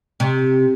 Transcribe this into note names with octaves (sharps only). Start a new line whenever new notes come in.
C3